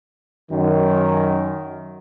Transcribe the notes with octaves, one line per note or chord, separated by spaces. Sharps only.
F#2 D#3